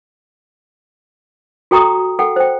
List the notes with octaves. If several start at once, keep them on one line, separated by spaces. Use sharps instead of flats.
F#4 A4 G5 A#5 C#6 D#6
A4 F#5 G5
C5 G5